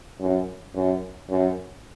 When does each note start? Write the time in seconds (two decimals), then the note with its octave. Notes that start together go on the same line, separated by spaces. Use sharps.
0.21 F#2
0.76 F#2
1.29 F#2